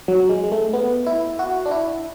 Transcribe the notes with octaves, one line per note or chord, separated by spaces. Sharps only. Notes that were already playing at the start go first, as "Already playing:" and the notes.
F#3
G#3
G#3
A3
B3
E4
F#4
D4
E4